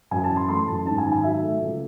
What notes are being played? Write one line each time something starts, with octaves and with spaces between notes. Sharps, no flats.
F#2 G#5
A5
E3
C6
A3 C6
F#2 A5
G#2 A5
G#5
D#3
G#5
F#3 E5
A3
C#2